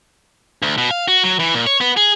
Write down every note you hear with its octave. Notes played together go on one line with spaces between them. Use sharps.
D2
B2
F5
F#4
F#3
E3
A#2
C#5
B3
G#4